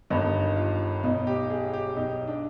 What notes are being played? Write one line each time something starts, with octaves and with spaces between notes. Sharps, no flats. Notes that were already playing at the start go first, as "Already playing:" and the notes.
G1 G2 D#3 D#4
F4
B1 B2 D#4
G4
G#4
G4
B1 B2 D#4
D4